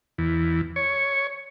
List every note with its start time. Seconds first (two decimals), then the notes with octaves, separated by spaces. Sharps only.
0.18 E2
0.76 C#5